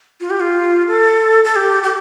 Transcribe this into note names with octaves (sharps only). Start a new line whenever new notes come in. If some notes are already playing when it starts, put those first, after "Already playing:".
F4
G4
F4
A4
A4
G4
G4